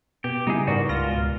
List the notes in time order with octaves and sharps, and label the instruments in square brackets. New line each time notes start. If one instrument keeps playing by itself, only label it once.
[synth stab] B2 [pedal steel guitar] G4
[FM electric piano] C#3 G3 [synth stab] B3 E4 [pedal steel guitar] D#4 G#4
[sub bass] G#2 [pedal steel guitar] F#4 [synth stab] A#4 B4 D5
[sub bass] C#2 [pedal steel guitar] F4 [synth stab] A#6
[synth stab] B2